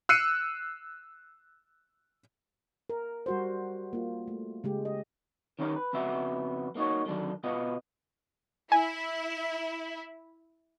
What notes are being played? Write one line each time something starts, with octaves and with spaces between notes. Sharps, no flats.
E6 F#6 C7 C#7 D#7
A#4
G3 F#4 C5
A#3 F4
A3
C#3 G#3 G4
D#5
D#3 C#4 D#4 E4 G4 A#4
B4
F2 C#3 B3 F#4 E5
A#3 D#4 F#4 C#5
D3 D#3 F#3 D4
B2 B3 F4 F#4 D#5
E4 G#5